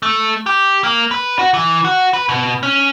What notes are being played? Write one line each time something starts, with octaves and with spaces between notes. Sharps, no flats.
A3
G4
A#3
B4
F#4
E3
F#4
B4
B2
C#4